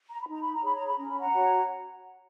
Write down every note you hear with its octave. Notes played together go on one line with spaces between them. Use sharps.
A#5
B5
D#4 A#5
B5
A#5
G#4 C#5 B5
A#5
B5
C#4 A#5
B5
F#5 A#5
F#4 C#5